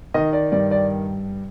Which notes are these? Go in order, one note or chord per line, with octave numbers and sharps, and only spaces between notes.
D#3 D#5
D5
G2 D5
D5